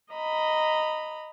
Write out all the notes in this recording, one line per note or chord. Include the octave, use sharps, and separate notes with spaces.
D#5 A#5 B5